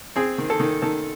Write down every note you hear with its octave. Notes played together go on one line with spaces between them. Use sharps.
C4 G#4
D#3
A4
D#3
D#3 A4